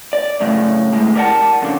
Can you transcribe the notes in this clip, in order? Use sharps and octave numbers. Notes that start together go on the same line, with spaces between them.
D5
F#2 A2 C#3
D2 A2 G#3
G4 A#4 D5 D#5 F#5 A5
F2 C#3 D4